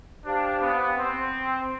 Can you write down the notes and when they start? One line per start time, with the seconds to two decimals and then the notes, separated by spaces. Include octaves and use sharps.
0.25 D4 G4 C5 F5 A5
0.61 B3
0.97 C4